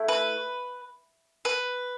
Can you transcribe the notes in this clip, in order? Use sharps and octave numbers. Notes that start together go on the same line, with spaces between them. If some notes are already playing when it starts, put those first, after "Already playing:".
Already playing: A3 E4
B4
B4